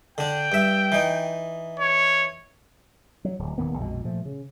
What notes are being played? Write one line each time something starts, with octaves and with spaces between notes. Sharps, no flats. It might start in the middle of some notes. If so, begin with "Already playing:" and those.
D3 D4 G5
G2 E5
E3 D#4
C#5
F#3
D1
D#1 D#3 A#3 B3
A#1 F2 B2 G#3
A#2 F3 A3
C#3